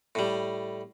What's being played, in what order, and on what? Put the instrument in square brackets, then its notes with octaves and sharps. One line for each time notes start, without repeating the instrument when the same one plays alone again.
[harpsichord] A2 G3